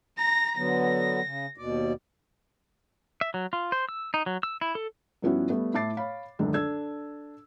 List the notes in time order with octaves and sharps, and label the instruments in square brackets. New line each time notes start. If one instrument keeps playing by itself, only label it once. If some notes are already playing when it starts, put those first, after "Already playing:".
[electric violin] A#5 A#6
[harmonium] D3 F#3 B3 [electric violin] A#6
[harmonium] C#3
D#2 B2 D5
[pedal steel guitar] E5
F#3
F4
C5
E6
D#4
F#3
E6
E4
A4
[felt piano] G2 F3 B3 C#4 E4 F#4
G3 A3 B3
A2 E5 A5 D6 A6 C7
C#5 F5 B5
C#2 F#2 D3 D#3
D4 A4 E6 G#6